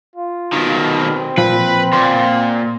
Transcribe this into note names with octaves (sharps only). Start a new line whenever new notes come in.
F4
B2 D#3
C4
A#2 F3 B4
A#2 C6